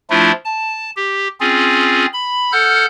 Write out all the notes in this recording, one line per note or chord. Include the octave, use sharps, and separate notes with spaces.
F3 A3 D4 E4 F4
A5
G4
C4 C#4 F4 G#4
B5
A4 F#5 F6 G6